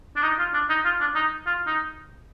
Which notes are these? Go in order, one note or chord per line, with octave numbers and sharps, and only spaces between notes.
D4
D#4
F4
D4
D#4
F4
D4
D#4
F4
D#4